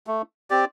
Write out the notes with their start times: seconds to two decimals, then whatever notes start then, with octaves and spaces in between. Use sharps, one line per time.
0.07 A3
0.50 C4 G4 D5